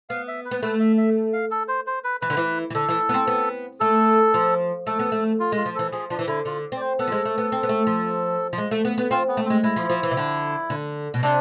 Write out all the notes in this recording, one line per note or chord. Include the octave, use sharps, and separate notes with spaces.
B3 F5
E5
B4
B3
A3 B4
E5
E5
F5
A4
C5
C5
B4
E3 B4
D3
E3
E3
D3 A4
E3
B3
C4
B3
A3 A4
F3
A3 A4
B3
A3
F4
G#3
F4
F3
E3 A4
F3 G#4
F3 D4
E3
D3 E4
D3 F4
C4 D5
C5
B3 A4
F3
G#3
A3
B3
C4
B3
A3
F3
F3
G#3
A3
B3
B3
C4 F4
B3
A3
G#3 C4
G#3 E4
F3
F3
E3
C3
D3
D3
B2
C3 D4